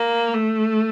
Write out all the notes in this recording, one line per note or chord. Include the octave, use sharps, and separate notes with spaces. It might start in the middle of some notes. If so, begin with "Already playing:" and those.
Already playing: A#3
A3